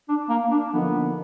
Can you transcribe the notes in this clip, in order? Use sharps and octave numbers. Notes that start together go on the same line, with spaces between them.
D4
A#3
D4
D3 F3 A#3 B3 D#4